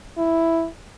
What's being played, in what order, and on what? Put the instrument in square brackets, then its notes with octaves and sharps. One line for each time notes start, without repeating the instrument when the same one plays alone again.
[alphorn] E4